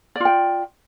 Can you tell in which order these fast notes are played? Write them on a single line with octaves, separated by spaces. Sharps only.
D5 F4 G5